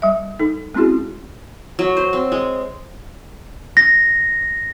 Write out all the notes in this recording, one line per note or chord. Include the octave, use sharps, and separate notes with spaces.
G3 E5
D#4 A4
G#3 C4 C#4 E4 F#4 G#4
F#3
C5
C4
G#3
A#6